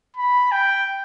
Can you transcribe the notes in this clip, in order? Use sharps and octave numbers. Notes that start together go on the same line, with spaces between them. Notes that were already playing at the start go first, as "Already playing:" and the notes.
B5
G5